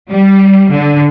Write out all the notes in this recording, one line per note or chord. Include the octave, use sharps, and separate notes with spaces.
G3
D3